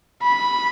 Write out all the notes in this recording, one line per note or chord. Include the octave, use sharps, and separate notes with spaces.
B5